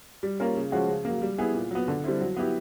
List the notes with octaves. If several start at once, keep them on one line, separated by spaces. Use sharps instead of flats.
G3
A#3 C#4 F4 A#4
C#3
F3 G#3 C#4 F#4
C#3
A#3
F#3
G3
B3 E4 G#4
A#2
F#3 B3
D3
G3 C4 E4
F#3
B3 E4 G4